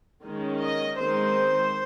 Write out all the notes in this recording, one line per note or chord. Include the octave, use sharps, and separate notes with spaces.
D#3 G#3 C#4
D#5
D#3 G#3 C4 C5